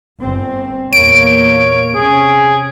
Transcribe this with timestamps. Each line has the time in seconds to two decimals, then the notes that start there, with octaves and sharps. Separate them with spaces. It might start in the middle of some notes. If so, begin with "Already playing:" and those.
0.20 G1 C4
0.93 E2 A#2 A#3 C#5 D7
1.95 C3 C#4 G#4